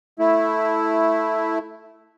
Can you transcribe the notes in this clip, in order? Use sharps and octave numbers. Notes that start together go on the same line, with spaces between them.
A3 E4